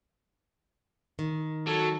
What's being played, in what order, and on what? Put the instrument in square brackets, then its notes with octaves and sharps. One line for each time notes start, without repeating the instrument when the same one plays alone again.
[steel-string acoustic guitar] D#3
[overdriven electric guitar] F#3 [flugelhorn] A4